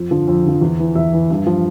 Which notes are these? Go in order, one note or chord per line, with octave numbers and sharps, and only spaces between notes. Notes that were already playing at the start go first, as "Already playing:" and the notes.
Already playing: F2
D3 F3
F2
D3 F3
E2
E3
E2 E5
E3
G2
F3